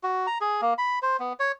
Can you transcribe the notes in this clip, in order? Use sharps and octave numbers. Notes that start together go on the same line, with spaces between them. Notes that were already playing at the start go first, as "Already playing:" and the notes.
F#4
A#5
G#4
A#3
B5
C5
B3
C#5